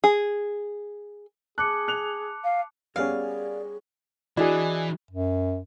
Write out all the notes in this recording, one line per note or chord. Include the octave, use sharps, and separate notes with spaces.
G#4
G#4 A5 D6 F#6 C#7
F#6 F7
F5
G3 B3 C#4 G#4 A#4 D5 F5 G#5
E3 D4 E4 F#4 G#4 D#5
F#2